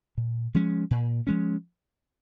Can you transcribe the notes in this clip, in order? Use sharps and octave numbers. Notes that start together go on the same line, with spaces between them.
A#2
F3 G#3 C#4
A#2
F3 G#3 C#4